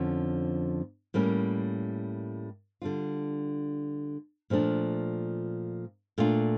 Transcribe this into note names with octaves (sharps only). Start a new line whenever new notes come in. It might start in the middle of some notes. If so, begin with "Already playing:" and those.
Already playing: F2 D3 F3 C#4
A2 G3 A#3 C#4
D3 G3 D4 F4
A#2 F3 A3 D4
A#2 A3 D4 F4